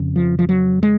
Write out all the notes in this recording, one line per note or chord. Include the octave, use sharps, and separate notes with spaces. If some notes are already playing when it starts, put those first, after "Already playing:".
Already playing: F2 C#3
F3
F3
F#3
G#3